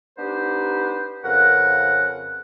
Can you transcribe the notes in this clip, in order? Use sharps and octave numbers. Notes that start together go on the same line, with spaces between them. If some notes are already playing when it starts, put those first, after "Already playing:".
B3 D4 D#4 G4 B4 C5
F2 C#3 A#4 B4 F#5